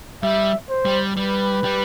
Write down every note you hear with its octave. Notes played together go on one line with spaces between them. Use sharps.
G3 E5
C5
G3
G3 B4
G3